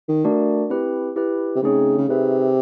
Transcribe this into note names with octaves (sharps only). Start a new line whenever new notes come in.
D#3
A3 D4 F#4 A#4 D5
C4 E4 G4 B4
E4 G4 B4
C3
C#3 A3 C4 D#4 G#4 C#5
C#3
C3 D#4 G#4 B4 E5